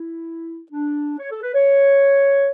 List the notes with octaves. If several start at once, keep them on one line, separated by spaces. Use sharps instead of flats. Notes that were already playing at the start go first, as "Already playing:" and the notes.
Already playing: E4
D4
C#5
A4
B4
C#5